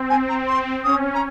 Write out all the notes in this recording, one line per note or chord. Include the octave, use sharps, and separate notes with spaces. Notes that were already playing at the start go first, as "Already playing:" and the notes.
Already playing: C4
G#5
A#5
C6
C#4 D#6
A#5